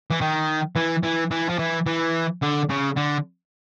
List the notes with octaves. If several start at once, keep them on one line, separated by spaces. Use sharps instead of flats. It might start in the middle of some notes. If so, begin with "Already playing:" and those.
E3
D#3
E3
E3
E3
F3
E3
E3
D3
C#3
D3